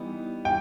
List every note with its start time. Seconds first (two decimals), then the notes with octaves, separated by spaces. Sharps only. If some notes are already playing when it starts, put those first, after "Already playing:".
Already playing: E3 G3 B3 D#4
0.45 E3 G3 G5